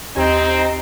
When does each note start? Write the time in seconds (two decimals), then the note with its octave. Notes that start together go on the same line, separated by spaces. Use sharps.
0.16 D#2 C4 D#4 G4 G#6